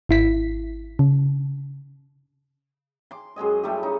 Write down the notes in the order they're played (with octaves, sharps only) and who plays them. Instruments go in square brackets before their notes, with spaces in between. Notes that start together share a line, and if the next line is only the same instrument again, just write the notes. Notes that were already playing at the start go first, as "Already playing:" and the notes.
[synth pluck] G#1 E4 B6
C#3
[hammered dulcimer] C6 D6
F#2 G#3 G#4 D#5
G3 A3 E4 G4
C#3 D#4